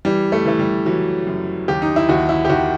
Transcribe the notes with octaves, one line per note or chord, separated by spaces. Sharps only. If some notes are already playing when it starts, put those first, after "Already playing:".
E3 G3
A3
E3 A3
G3
E3 F#3
F#2
D#2 G4
D#4
E4
D#2 F#4
E4
G4
D#3 F#4